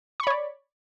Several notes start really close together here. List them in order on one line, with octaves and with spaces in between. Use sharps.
C#6 B5 C#5 D5